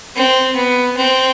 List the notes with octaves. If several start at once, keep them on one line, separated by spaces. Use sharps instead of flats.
C4
B3
C4